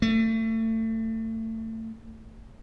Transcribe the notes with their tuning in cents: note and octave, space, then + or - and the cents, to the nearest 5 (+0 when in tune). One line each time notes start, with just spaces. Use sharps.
A3 +30